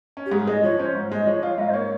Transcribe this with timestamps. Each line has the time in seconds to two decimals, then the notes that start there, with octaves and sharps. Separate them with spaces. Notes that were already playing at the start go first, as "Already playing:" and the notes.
0.17 C#4
0.26 G4
0.31 G#2 G#4
0.47 G#3 D#5
0.63 F3 C#5
0.79 C#4 C5
0.95 G#2
1.11 G#3 D#5
1.27 F3 C#5
1.43 F4 F5
1.58 G#2 D#5
1.70 C5
1.73 A#3 C#5